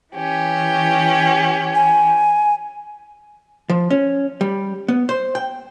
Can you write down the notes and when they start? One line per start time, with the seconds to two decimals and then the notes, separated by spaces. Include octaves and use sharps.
0.14 E3 C#4 G4
1.75 G#5
3.70 F3
3.90 C#4
4.41 G3
4.88 B3
5.09 C5
5.35 G5